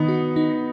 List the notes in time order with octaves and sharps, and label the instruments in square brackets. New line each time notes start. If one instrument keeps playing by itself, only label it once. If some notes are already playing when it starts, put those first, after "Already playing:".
Already playing: [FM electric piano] D#3 [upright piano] B3 D#4
[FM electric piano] F#4
D#4